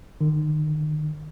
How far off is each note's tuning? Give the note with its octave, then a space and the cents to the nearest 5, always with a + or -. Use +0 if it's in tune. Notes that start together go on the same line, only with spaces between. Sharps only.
D#3 -35